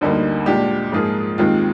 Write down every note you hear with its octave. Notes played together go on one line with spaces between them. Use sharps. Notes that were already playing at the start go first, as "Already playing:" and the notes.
D2 D3 G3 A#3 D#4
A#2 G#3 D4 G4
G#2 F3 A#3 F4 G#4
D#2 D#3 G#3 C4 F4